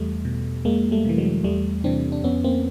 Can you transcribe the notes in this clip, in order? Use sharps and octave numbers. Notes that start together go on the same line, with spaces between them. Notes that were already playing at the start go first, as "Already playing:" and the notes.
Already playing: E2 G3 A3
B2
F2 G#3 A#3
G3 A3
C3 E3
F#3 G#3
E2 G3 A3
C3 E3 C4 D4
D4
F2 B3 C#4
A#3 C4